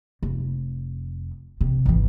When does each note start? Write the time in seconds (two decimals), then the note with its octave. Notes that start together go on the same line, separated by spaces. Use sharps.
0.23 F1
1.61 C3
1.86 G#1 E3